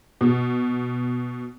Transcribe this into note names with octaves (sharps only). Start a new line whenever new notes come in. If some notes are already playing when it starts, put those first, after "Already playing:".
B2